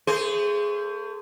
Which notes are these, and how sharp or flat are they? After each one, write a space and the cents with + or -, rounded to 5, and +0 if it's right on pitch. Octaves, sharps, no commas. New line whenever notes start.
A3 +35 G#4 +0 C5 -20